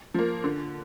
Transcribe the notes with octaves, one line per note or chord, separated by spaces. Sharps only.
F3 A#3
D3